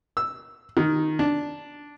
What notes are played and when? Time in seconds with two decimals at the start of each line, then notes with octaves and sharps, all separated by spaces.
0.17 E6
0.77 D#3
1.19 D4